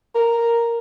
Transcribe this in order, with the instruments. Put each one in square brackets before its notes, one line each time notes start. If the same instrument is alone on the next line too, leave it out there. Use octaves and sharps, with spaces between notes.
[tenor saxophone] A#4